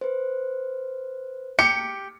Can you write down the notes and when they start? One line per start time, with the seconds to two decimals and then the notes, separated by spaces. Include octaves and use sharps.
0.01 B4 C5
1.59 G4 C#7